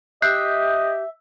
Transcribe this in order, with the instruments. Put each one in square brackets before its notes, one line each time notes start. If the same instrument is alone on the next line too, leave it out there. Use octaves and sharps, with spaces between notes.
[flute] G4 [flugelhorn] D#5 [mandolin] E5 [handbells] F#6 G6 C7